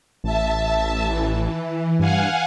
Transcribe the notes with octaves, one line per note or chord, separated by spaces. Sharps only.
A1 E5 A5
E3
G2 F5 F#5 G#5